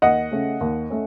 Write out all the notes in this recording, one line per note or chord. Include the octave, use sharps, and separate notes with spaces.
D#2 D#5 F#5
C#3 A3 C#4
D#2
A3 C#4